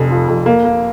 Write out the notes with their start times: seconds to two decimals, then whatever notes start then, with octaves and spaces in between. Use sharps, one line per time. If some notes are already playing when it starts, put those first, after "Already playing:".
Already playing: F1 F2
0.10 F3
0.28 F2
0.46 A#3
0.65 A#3